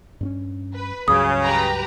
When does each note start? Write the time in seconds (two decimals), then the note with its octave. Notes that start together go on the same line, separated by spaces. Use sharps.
0.21 G2 C4 C#4
0.75 B4
1.08 C#2 G2 C#3 F#3 D#6
1.44 G4 B4 A#5